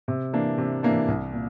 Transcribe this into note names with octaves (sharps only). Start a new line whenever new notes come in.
C3
E3 A#3 D4
C3
E3 A#3 D4
C2
A#2